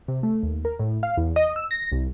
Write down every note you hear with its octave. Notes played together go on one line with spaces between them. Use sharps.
C3
A3
D#2
A#4
A2
F5
E2
D#5
E6
A#6
C2